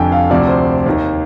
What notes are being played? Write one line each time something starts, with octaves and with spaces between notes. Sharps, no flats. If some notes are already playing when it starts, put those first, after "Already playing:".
Already playing: F1 F2 D3 G5 G#5
F5
D2 C3 F3 D5
C5
D#2 D#3